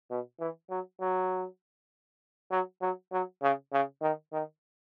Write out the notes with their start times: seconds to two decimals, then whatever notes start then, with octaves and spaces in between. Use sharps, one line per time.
0.10 B2
0.39 E3
0.70 F#3
1.00 F#3
2.51 F#3
2.81 F#3
3.12 F#3
3.42 C#3
3.73 C#3
4.02 D#3
4.33 D#3